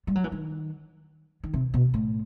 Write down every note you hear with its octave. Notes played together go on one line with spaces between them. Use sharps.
G3
F#3
E3
D#3
D#3
C3
B2
A2